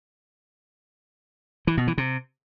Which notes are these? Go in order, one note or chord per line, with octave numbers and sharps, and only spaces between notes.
E3
B2
E3
C3